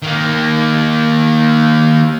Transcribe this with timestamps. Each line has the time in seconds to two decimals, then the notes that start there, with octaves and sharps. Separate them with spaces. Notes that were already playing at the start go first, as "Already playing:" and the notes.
0.02 D#3 A#3